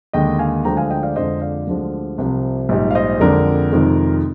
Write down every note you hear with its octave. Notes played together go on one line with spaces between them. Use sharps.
D#2 D3 G#3 D#5 G5
F5 G#5
D2 D3 F3 G#3 G5 A#5
F5 G#5
D#5 G5
D5 F5
F2 D3 F3 G#3 C5 D#5
D5 F5
D2 D3 F3 G#3
C2 C3 F3
A#1 G#2 G3
F5
C5 D#5
F2 D3 G#3 A#4 D5
F2 C3 D#3 G#3